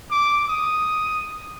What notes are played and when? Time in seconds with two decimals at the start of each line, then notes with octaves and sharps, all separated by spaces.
0.10 D6
0.48 D#6